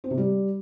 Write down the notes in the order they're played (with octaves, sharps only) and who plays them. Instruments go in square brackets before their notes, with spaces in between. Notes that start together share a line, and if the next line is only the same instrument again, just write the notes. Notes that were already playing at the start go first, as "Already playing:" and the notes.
[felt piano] C4
C3
G3